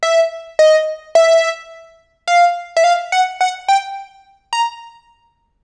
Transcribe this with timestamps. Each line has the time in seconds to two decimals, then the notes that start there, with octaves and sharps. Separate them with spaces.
0.03 E5
0.59 D#5
1.15 E5
2.28 F5
2.77 E5
2.84 F5
3.12 F#5
3.41 F#5
3.68 G5
4.53 A#5